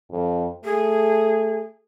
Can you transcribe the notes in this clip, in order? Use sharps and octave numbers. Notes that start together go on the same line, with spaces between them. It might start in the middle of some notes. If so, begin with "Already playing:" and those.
F2
A3 G#4